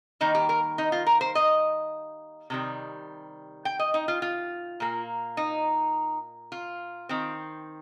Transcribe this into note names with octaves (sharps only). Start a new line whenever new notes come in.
D#3 G3 A#3 D#4
G4
A#4
D#4
F4
A#4
C5
D#5
C3 D#3 G3
G5
D#5
D#4
F4
F4
A#2 A#3
D#4
F4
D#3 C4